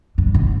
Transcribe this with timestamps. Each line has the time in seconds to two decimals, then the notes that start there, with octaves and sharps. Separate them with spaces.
0.18 G2
0.34 G#2